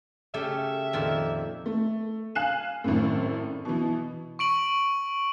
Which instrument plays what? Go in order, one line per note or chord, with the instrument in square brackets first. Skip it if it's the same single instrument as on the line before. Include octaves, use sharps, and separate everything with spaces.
[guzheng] C#3 A3 G4 [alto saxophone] E5
[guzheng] F2 A#2 D#3
[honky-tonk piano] A3
F5 G#5 F#6 C7 E7
G#1 F#2 A2
B2 E3
[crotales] C#6 D7 F#7